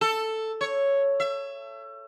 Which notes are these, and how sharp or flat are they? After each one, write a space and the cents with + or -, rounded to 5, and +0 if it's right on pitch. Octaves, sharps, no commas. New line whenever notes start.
A4 +5
C#5 +0
E5 +30